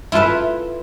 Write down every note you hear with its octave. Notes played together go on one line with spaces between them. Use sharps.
E4 F4 A4 B4 E5